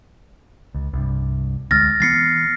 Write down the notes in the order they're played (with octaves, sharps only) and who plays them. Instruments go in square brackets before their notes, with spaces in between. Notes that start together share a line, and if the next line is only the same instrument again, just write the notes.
[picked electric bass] C#2
C2 G2
[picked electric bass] D2 G#3 [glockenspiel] F6 A6 A#6
[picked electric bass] E3 F#3 B3 [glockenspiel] A6 C7 C#7